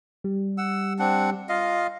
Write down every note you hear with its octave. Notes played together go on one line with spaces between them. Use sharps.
G3
F#5 E6
C4 D4 F#5
F4 D#5 F5